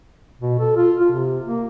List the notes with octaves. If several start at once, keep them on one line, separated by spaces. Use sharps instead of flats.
B2
A4
F4
F4
C3
A#3